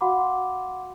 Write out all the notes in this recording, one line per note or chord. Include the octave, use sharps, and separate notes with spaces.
F#4 F5 F#5 B5 C6 D6